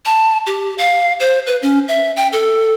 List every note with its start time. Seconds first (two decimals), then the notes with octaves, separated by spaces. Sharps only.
0.05 A5
0.47 G4
0.78 F5
1.20 C5
1.47 B4
1.62 C#4
1.88 E5
2.17 G5
2.33 A4